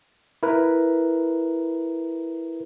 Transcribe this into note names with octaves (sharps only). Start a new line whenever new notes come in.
E4 A#4 B4